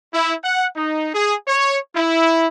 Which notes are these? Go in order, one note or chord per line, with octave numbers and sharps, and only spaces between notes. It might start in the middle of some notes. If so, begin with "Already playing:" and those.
E4
F#5
D#4
G#4
C#5
E4